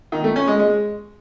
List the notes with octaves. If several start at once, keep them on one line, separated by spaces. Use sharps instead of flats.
D#3
A3
C#4
G#3
G#3